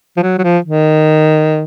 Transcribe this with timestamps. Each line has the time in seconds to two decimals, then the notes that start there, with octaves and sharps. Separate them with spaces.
0.17 F3
0.23 F#3
0.39 F#3
0.44 F3
0.65 D#3